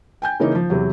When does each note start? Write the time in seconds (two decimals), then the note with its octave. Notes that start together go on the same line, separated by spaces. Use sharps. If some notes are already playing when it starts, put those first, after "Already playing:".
0.22 G5 G#5 G6
0.40 C#3 E3 A#3 C#4 D#4
0.55 F3
0.70 E2 C3 F#3